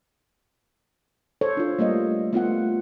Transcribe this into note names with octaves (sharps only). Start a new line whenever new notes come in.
A4 C5 C#5
D4 F4
G3 A3 A#3 D#5
A3 B3 F4 F#5